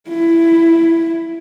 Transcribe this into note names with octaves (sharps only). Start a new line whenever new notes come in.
E4